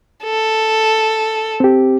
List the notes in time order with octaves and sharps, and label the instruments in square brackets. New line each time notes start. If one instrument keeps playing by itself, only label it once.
[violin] A4
[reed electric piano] C4 G4